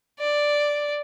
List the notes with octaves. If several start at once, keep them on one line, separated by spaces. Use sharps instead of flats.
D5